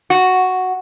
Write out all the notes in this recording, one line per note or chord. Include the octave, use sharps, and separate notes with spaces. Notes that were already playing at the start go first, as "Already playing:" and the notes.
F#4